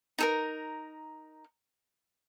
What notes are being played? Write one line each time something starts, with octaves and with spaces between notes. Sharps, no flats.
D#4 A4 A#4